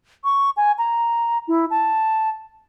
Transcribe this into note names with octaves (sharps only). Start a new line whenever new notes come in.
C#6
G#5
A#5
E4
A5